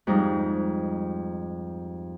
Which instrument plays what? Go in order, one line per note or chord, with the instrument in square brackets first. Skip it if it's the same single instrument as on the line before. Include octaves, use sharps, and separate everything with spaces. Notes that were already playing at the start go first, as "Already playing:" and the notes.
[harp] F2 G#2 G3 D#4